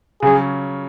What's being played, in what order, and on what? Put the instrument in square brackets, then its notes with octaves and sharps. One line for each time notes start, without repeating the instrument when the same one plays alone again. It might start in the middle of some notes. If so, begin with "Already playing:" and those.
[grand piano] C#3 F#3 C#4 [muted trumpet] G#4